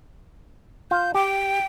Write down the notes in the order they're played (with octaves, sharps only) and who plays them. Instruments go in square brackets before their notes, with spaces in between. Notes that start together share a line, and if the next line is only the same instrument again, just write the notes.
[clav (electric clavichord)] F4 [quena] G6
[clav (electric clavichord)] G4 [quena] G5